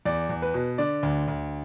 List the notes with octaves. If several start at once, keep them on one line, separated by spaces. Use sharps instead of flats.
E2 D5
E2
B4
B2
D3 D5
D2
D2